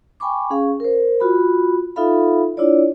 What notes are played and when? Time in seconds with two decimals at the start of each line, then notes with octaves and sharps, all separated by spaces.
0.20 G5 G#5 B5 C#6 D6
0.50 C#4 G#4 F5 C#6
0.80 A#4 C5
1.20 F4 F#4 B5
1.96 D#4 F4 A4 E5 F5 B5
2.57 D4 E4 F4 C#5 D5